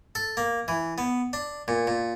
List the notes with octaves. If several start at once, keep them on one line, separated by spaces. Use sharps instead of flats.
A4
A#3
E3
B3
D4
A#2
A#2